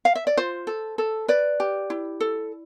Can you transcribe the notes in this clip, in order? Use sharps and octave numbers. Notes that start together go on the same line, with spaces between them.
F5
E5
D5
F4 C5
A4
A4
B4 D5
G4
E4
A4